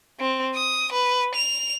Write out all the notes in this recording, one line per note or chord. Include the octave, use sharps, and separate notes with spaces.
C4
D#6
B4
F7